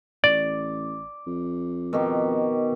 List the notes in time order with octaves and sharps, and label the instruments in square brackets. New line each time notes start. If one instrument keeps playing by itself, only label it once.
[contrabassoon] A1 [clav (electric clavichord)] D5 [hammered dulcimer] D6
[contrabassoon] F2
[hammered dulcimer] B2 D#3 G4